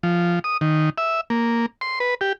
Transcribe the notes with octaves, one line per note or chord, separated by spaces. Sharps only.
F3
D#6
D#3
E5
A#3
C6
B4
G4